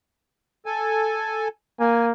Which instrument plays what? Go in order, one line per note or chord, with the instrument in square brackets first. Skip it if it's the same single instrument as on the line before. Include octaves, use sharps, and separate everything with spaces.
[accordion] A4 G#5
[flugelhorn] A#3 [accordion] G#5